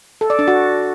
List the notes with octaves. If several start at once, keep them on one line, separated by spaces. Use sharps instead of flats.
A4
D5
D4
F#4